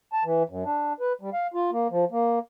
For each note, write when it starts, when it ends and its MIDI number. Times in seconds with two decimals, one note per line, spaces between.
0.13 0.24 81
0.25 0.43 52
0.49 0.64 42
0.65 0.93 62
1.00 1.13 71
1.21 1.30 55
1.33 1.47 77
1.54 1.71 65
1.72 1.88 58
1.91 2.05 53
2.11 2.39 58